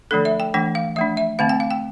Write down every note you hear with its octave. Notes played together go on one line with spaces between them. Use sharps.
D3 F3 A3 D4 A4
E5
G5
E3 A3 D4 G5
F5
F3 A3 D4 E5
E5
D3 A3 C4 F5
G5
F5
G5